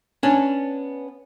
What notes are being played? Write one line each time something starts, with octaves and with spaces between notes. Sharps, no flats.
B3 C#4 D4